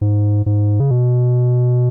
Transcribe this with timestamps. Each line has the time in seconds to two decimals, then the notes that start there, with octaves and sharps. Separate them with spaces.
0.01 G#2
0.46 G#2
0.80 C#3
0.91 B2